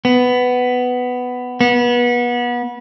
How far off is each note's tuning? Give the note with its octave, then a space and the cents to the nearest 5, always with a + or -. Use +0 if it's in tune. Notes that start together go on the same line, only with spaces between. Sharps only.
B3 +10
B3 -30